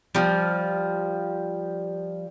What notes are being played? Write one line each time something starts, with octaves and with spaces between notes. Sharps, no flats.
F3 G3